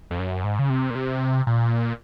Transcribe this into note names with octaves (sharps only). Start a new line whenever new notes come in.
F2
F#2
G#2
C#3
C3
A#2
C3
A#2